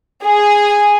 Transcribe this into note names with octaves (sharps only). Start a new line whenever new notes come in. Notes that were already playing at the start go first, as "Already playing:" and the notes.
G#4